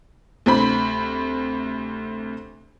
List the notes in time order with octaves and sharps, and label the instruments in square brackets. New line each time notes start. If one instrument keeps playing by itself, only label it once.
[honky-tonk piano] D2 C3 C5 B5